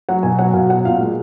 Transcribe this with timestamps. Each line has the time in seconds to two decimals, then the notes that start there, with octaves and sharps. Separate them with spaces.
0.09 F#3 F#5
0.23 B2 G#5
0.39 F#3 F#5
0.54 B2 F5
0.70 F#3 F#5
0.85 A#2 F5
1.00 G#3